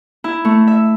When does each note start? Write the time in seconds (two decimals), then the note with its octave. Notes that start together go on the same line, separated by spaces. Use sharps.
0.24 E4
0.45 A3
0.67 E5